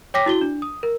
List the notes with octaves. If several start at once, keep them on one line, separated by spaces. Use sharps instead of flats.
C#5 G5 D6 A#6 B6
E4 F#4 G7
D4
D#6
A#4